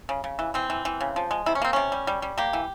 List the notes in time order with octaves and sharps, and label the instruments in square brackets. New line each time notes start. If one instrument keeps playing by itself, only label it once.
[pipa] C#3
C#3
E3
E3 C4
E3
E3
C#3
F3
G#3
C3 E4
C#4
A#3 C4
C3 C#4
G3
G3
G3
A#3 G4
E3